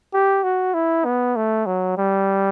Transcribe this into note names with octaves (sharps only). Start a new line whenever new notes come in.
G4
F#4
E4
B3
A3
F#3
G3